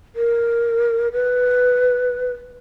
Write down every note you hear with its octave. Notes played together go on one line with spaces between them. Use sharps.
A#4
B4